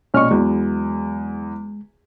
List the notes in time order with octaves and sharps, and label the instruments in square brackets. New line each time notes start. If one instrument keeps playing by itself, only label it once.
[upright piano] A#1 D#5 C#6 [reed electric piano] B2 C#4 F6
[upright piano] E2 F#3 [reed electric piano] G#3